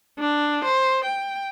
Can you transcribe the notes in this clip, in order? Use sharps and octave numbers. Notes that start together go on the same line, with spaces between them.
D4
C5
G5